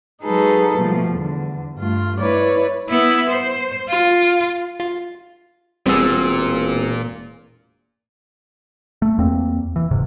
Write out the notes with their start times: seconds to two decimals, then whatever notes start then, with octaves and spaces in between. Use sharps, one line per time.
0.23 F#3 G#3 D#4 G#4 A4 B4
0.78 B2 F3 G3 A3
1.10 E2 D3
1.77 G2 A3 F4
2.21 E4 B4 C#5 D5
2.89 B3 E4
3.30 C5
3.89 F4
4.80 F4
5.86 E1 A#2 G3 B3 C4 G#4 E6
9.02 A3
9.18 E2 A#3 C4
9.76 E3
9.91 E1 G#2 C3